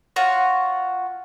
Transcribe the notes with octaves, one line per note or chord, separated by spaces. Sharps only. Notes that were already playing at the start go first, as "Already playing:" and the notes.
F4 F#4 C#5